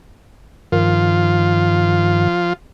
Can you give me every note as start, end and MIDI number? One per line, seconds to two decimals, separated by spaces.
0.72 2.28 43
0.72 2.28 51
0.72 2.53 53
0.72 2.53 65